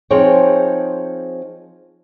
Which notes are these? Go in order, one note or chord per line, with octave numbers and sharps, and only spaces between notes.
F3 C4 D#4 G#4 C#5